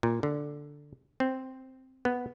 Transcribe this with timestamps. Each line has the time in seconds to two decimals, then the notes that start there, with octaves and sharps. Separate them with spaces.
0.03 A#2
0.23 D3
1.20 C4
2.05 B3